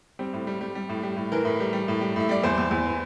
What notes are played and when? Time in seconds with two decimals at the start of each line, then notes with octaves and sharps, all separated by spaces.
0.19 G3 C4
0.33 A2
0.47 G3
0.61 G3
0.75 G3
0.89 A2
1.03 G3
1.17 A2
1.32 E3 A#4
1.45 A2
1.60 G3
1.73 G3
1.88 A2
2.01 G3
2.16 A2 E5
2.29 G3 D5
2.44 E2 C5
2.58 E2
2.71 E2
2.85 E3